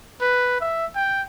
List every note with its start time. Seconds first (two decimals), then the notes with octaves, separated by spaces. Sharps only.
0.21 B4
0.61 E5
0.95 G5